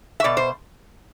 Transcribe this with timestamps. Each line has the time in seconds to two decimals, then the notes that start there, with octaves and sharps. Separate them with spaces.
0.20 E5
0.24 B2 D5
0.37 C5